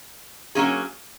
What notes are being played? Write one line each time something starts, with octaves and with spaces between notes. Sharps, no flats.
F#3 A#3 C#4 G#4